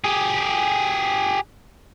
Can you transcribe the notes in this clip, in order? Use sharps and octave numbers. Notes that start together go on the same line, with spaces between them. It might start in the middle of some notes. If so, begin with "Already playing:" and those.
G4 G#4